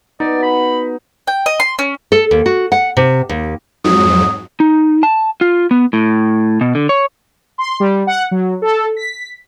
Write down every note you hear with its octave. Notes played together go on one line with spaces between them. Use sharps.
B3 D#4 F#4 D5
B5
G5
D#5
C6
C#4
A4
D#2
F#4
F#5
C3
D#2
F2 G#2 F#3 D#6
D#4
A5
F4
B3
A2
B2
D3
C#5
C6
G3
F#5
F#3
A4
B6